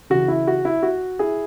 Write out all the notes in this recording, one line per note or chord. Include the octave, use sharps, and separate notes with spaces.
C#3 E3 F#4
E4
F#4
E4
F#4
E4 G#4